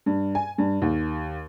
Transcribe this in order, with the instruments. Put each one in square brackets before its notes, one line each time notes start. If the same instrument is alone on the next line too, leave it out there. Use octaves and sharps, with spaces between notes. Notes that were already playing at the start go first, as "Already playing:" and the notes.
[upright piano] G2
G#5
G2
D#2